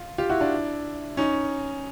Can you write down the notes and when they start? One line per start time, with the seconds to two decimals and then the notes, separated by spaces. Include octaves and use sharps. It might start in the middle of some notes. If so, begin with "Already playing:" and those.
Already playing: F4
0.18 F4 G4
0.30 E4 F#4
0.40 D4 E4
1.17 C#4 D#4